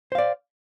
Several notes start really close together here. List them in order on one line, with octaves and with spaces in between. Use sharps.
C5 F5 D5